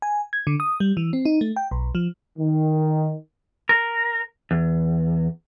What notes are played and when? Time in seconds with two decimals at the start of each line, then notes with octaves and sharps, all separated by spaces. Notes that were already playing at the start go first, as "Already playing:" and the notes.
0.02 G#5
0.33 G#6
0.47 D3
0.60 D#6
0.80 G3
0.97 E3
1.13 C4
1.25 D#4
1.41 A3
1.56 G5
1.71 B1
1.95 F3
2.38 D#3
3.69 A#4
4.51 E2